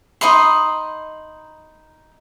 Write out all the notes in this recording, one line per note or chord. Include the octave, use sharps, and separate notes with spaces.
D#4 D#5 B5 C6